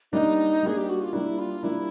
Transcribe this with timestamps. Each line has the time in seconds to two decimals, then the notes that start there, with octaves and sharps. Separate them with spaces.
0.12 G3 A#3 D4 D#4
0.63 G3 A#3 D4 G#4
0.77 G4
0.89 F#4
1.01 F4
1.13 G3 A#3 D4 E4
1.39 F4
1.63 G3 A#3 D4 E4